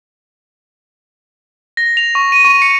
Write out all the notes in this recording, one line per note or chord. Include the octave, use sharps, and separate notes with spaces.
A#6
F7
C#6
D#7
C#6
C#7